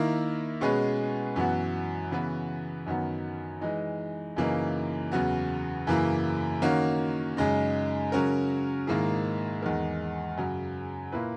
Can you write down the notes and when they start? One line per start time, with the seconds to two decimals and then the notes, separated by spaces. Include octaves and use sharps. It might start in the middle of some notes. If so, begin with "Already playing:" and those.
Already playing: D#3 A#3 E4
0.61 B2 G#3 C#4 G#4 B4
1.36 F#2 E3 B3 F#4
2.11 C#3 E3 B3 F#4 B4
2.86 F#2 D#3 F#3 B3
3.61 E3 G#3 D#4
4.36 F#2 C#3 E3 A#3 D#4
5.12 E2 C#3 F#3 B3 F#4
5.87 F#2 C#3 E3 A#3 E4
6.62 D#3 A#3 C#4 F#4
7.37 F#2 C#3 G#3 D#4
8.12 C#3 F#3 C#4 F#4 A#4
8.87 G#2 D#3 A#3 E4 G#4
9.62 E2 D#3 G#3 D#4 A#4
10.37 F#2 C#3 F#3
11.12 A#2 A#3 E4 B4